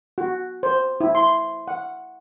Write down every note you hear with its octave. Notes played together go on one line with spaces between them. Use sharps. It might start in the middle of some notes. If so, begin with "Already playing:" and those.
F#4
C5
E4
C6
F#5